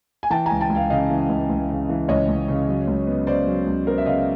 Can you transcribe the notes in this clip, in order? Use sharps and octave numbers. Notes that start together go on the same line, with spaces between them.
G#5
E3 G5 A5
C#2 G#5 A#5
G5 A5
C#2
F5 G5
C#3 D#5 F5
E3
C#2
C#2
C#3
E3
C#2 C#5 D#5
C#2
C#3
F#3
C#2
B3
C#3 C5 D5
F#3
C#2
B3 A#4 C5
E5
C#3 D#5 F5